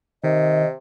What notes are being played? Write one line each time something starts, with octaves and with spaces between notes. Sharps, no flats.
C3 D#3 D#5